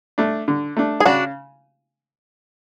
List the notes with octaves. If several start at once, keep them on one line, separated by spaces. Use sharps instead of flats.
A3 D4
D3
A3 D4
G#4
C#3 D4 F#4